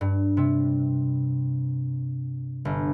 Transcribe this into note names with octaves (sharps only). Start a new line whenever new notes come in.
G2
C3
G1